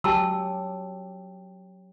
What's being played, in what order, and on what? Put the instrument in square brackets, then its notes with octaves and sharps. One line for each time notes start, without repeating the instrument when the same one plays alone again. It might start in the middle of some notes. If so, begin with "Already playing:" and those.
[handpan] F#3 G4 [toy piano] G#5 A5 E6